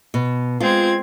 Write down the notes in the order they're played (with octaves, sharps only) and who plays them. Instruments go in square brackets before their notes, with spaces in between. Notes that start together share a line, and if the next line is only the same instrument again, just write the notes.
[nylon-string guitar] B2
[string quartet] G#3 C4 G#6 [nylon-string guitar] F4